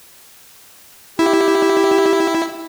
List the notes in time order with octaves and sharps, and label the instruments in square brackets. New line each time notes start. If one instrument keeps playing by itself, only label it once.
[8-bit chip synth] E4 [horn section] G4